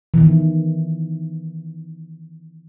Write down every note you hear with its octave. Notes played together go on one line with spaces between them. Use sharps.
D#3 E3